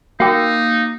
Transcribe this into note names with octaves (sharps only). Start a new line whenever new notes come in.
A#3 D#4 F#4 F5 G5 D6 E6